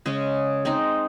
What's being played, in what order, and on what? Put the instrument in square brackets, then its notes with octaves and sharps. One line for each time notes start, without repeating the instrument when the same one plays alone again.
[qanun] C#3 G#3 C#4
G#3 C4 D#4